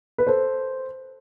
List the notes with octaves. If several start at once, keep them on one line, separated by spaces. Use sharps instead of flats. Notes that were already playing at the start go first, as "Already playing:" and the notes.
B4
A4 C5